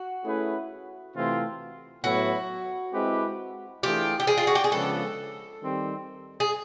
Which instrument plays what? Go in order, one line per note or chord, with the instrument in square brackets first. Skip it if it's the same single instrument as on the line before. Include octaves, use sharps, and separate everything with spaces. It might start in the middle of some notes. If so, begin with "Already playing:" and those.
Already playing: [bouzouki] F#4
[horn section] A3 C#4 E4 G#4 B4
C3 E3 A3 C4 F4
[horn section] A2 F#3 B3 E4 [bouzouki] F#4
[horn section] G#3 C4 E4 G4 B4
[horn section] E3 A3 D4 F4 G#4 [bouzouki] G4
[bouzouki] G4
G#4
F4
F#4
G4
G#4
[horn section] C#3 F3 G#3 B3 D4 [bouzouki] A4
[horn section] D#3 G3 C4
[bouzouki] G#4